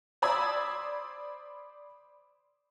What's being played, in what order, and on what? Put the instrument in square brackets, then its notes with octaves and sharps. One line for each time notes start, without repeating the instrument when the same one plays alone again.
[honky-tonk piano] C5 D5 B5 D#6 E6 G#6